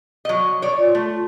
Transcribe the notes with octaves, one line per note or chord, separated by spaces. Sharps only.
F#3 D#5
C#5 D5
F4
A3